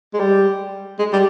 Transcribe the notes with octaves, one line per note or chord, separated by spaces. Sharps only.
G#3
G3
G#3
G3